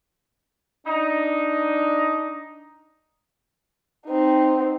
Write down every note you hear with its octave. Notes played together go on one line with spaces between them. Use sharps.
D4 D#4
C4 D#4